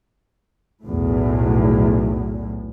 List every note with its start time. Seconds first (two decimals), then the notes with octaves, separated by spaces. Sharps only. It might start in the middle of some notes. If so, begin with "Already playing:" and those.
0.83 B1 E2 A2